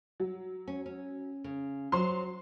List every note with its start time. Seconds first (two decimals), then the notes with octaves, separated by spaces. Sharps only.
0.20 F#3
0.67 C#4
0.86 C#4
1.44 C#3
1.92 F#3 C5 C6